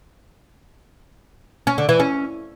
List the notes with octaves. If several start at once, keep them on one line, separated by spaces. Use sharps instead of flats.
C#4
D3
E3
C#4